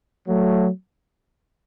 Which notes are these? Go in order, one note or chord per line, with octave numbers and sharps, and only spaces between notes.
F#3 A3